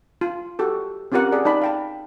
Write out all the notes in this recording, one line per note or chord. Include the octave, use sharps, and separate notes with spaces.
F4
F#4 G4 A4
C4 C#4 F4 G4 A#4 F#5
G#4 D5
D#4 D5 A5 B5
F5 G5 A5